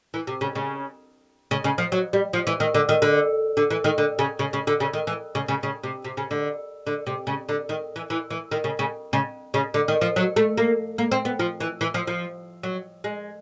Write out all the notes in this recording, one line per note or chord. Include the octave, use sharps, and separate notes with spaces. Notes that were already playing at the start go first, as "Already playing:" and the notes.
E3
C3
C#3
C#3
C#3
C#3
F3
F#3
G3
F3
E3
D#3
D3
D#3
D3
D3
E3
D#3
D3
C#3
C#3
C#3
D3
C#3
D#3
E3
C#3
C#3
C#3
C3
C3
C#3
D3
D3
C3
C#3
D3
D#3
E3
E3
E3
D#3
C#3
C#3
C#3
C#3
D3
D#3
F3
F#3
A3
A#3
A#3
C4
B3
F3
E3
E3
F3
F3
F#3
G#3